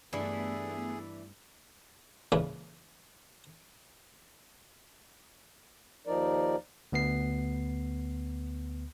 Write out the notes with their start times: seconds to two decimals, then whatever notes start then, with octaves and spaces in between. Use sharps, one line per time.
0.13 G2 E3 A3 B3 D4 E4 G#4
2.32 C#2 A#2 C#3 E3
6.07 D#2 F3 D#4 A#4 D5
6.92 D2 B3 C7